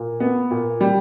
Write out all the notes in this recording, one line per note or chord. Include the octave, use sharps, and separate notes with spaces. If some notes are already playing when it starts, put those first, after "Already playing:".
Already playing: A#2
B3
A#2
G3